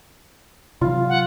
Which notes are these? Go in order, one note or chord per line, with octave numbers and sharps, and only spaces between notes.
C3 E3 F#3 F4
F#5